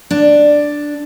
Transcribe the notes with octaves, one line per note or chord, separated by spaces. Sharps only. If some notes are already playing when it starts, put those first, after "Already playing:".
D4